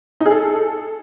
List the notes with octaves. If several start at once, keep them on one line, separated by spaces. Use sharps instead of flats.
D#4
G#4
A4